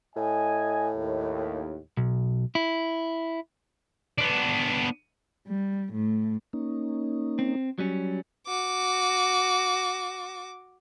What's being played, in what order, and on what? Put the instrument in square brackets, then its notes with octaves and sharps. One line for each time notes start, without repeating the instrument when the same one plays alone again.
[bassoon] A2 [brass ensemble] D#5 G#5
[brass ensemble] D#2
[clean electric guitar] B1
E4
[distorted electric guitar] B3 D4
[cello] G3
A2
[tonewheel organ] A#3 C#4 D#4
[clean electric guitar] C4
F#3 G3 C#4
[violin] F#4 D6